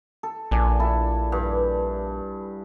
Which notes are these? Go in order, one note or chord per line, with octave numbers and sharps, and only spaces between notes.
A4
A#1 D4 G#5
E4 A4
G2